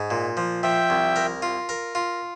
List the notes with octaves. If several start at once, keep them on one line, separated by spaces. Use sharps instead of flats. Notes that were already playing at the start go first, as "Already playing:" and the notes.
Already playing: G#2
A#2
F3
F3 E5 G5
C2
A#4
F4
A#4
F4